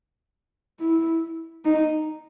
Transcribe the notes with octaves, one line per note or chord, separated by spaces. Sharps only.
E4
D#4